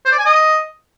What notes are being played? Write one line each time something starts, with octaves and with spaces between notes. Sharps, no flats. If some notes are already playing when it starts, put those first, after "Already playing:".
C5
D5
G#5
D#5